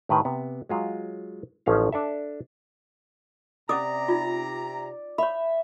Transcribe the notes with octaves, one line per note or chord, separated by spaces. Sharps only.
A2 D#3 G4 B4
C3 B3
F#3 G#3 F4
A1 F3 C#4 D#4 F5
D4 A4 E5
C3 C#4 D5 A#5 D6 D#6
D#4 F4
C#5 E5 B5